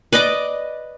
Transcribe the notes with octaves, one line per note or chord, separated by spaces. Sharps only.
B4 D5 D#5 D6